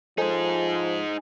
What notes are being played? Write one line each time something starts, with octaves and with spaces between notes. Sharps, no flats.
F3 D#4 G#4 A4 C5 G#5